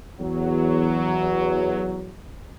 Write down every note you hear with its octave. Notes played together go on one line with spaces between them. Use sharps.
E2 F#3